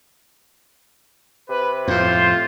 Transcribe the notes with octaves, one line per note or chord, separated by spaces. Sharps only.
C3 B4
F2 A2 F4 C5